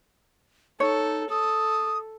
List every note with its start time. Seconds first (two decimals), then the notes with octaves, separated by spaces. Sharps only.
0.80 D#4 A4 C#5
1.30 A4 D#6